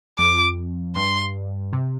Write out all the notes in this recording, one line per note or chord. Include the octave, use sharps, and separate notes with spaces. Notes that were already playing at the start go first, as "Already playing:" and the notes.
F2 D6
G2 C6
C3